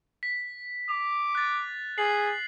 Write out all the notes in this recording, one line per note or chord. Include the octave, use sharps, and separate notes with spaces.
B6
D6 F7
F#6 A6
G#4 C7 F#7